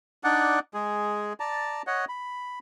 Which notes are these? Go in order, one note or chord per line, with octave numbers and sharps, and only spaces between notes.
D4 D#4 D5 F#5
G#3 G#4
D5 A5 A#5
C#5 D#5 F#5
B5